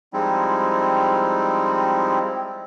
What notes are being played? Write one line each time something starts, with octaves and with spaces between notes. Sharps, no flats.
F3 G3 G#3 C4 D#4 E4